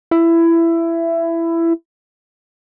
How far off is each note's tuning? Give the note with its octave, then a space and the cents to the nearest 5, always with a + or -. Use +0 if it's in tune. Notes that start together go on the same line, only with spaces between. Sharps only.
E4 +15